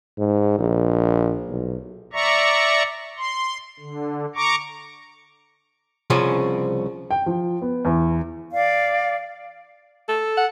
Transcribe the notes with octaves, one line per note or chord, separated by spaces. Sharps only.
G#2
A#1
B1
D5 E5 A#5 C#6
C6
D3
A#5 C#6 D6
C2 C#3 F3 C#4 G#4
G5
F3
B3
E2
D5 F5
A4
F#5